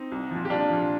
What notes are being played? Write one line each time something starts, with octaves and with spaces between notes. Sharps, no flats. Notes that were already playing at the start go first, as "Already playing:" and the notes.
Already playing: C4 D#4
C2
A#2 F3
G4
C2 D4 F4
A#2 F3